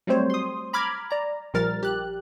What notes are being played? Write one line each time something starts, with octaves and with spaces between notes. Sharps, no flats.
F#3 G3 A3 C4 C5 C#5
C6 D#6
A#5 B5 D6 F6 G#6
D5 A#5
A#1 F3 G3 A#4 F6 A6
G4 F#6